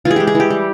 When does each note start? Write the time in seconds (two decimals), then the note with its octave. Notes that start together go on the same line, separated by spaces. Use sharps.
0.05 E3 F4
0.11 G#4
0.16 G#3 G4
0.27 G#4
0.35 E3
0.40 G4
0.50 G3